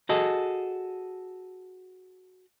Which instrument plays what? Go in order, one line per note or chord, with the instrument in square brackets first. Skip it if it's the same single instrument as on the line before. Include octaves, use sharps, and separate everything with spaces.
[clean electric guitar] F#4 G#4 A4 D#5